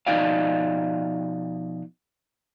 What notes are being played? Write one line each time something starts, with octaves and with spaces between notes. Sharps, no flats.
B2 F3 D#4 F#4 D5 F5